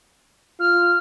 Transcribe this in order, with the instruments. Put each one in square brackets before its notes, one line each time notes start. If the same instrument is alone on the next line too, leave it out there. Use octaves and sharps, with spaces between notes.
[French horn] F4 [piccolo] F6